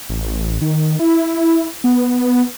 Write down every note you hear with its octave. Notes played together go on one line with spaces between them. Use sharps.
A1
D#3
E4
B3